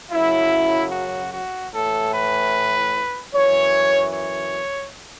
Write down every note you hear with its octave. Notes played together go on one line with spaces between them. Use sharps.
F#2 C#3 F#3 E4
F#4
F#4
A2 E3 A4
B4
F#2 E3 C#5
C#5